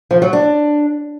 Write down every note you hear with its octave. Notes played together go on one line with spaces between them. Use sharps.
F3
F#3
D4